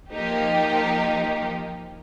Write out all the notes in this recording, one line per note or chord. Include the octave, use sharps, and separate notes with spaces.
F3 A#3 D#4 G4